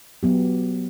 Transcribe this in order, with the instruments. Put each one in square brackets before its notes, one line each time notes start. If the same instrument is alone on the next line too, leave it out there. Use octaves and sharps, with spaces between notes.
[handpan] F#3 B3 G4